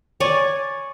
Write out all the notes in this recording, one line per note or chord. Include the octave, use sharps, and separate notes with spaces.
C#5 D5 G#5